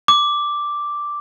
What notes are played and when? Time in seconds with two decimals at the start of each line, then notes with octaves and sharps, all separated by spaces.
0.08 D6